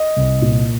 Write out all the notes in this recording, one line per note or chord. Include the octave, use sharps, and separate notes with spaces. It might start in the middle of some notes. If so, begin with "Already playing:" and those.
Already playing: D#5
C2
A#2